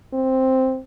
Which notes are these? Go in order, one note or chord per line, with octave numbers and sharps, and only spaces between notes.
C4